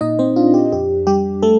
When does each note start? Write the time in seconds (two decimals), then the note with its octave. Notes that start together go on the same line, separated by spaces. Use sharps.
0.01 A#2 D#4 D#5
0.19 C4 C5
0.36 D4 F4
0.54 G4
0.72 F2 G4
1.07 G3 G4
1.42 A3 A4